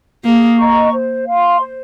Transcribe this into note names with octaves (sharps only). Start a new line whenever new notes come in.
A#3 G#4
D#5 A#5 C#6
C5
F5 C6
C5